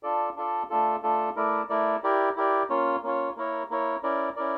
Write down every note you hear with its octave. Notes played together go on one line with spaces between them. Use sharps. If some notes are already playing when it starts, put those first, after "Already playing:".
D4 F4 A4 D5
D4 F4 A4 D5
A3 D4 F4 A4
A3 D4 F4 A4
A3 E4 A#4 D5
A3 E4 A#4 D5
E4 G4 A#4 D5
E4 G4 A#4 D5
A#3 C#4 F4 C#5
A#3 C#4 F4 C#5
A#3 E4 A#4 C#5
A#3 E4 A#4 C#5
C#4 E4 A#4 D5
C#4 E4 A#4 D5